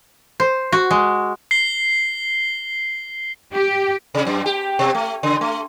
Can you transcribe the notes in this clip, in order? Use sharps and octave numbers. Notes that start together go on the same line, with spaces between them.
C5
F#4
G#3
C7 G7
G4
C3
F#2
G4
B2
A3
C#3
A3